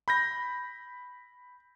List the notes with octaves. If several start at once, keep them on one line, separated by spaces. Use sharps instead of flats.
B5 G6 A#6